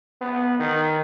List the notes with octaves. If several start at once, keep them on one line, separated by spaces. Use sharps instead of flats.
B3
D#3